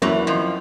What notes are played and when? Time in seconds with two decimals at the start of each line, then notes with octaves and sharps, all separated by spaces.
0.02 E2 E3 F#3 A#3 C#4 E4
0.27 F2 F3